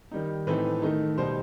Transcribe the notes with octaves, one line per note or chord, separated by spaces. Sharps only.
D#3 G3 D#4
A2 E3 A3 C4 D#4 B4
D#3 A3 D#4
B2 G3 D#4 C5